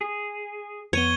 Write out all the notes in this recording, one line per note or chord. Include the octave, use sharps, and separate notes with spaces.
G#4
F2 B3 C#5 G#6 D#7 G7